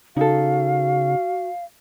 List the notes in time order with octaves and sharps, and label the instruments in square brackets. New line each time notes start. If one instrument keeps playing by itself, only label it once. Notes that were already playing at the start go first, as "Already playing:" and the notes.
[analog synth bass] C#3 [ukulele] D#4 A4 [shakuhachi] F#4 [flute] F5